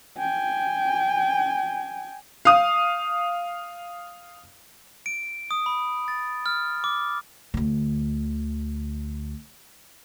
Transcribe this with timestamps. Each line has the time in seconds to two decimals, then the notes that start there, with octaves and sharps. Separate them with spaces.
0.18 G5 G#5
2.45 F5 D#6
5.06 D7
5.51 D#6
5.66 B5
6.08 A6
6.46 F6
6.84 D6
7.54 D2 D3